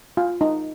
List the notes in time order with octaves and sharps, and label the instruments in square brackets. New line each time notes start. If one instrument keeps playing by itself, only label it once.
[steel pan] F4
D#4